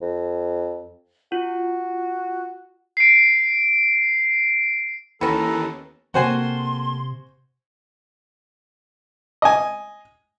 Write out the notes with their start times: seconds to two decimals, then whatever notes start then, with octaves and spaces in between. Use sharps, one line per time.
0.02 F2
1.32 F4 F#4
2.97 C7 D7
5.21 D#2 E3 B3 C#4 A4 A#5
6.14 C3 A3 A#3 C4 F#4 C5 G#5 C6
9.42 D#5 G#5